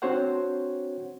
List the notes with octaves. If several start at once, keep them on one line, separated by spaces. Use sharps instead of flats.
C4 D4 F#4 C5 C#5 F#5